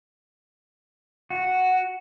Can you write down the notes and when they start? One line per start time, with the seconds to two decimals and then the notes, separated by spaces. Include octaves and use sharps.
1.30 F#4